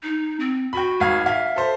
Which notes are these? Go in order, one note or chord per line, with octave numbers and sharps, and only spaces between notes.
D#4
C4
F#4 G5 B5
G#1 F5 G#6
E5 F5
A4 C5